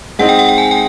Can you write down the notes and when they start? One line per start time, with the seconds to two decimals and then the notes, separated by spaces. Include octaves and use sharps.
0.19 G#3 C4 D#4 F#5
0.29 G5
0.39 F#5
0.49 G5
0.58 G#5
0.71 G5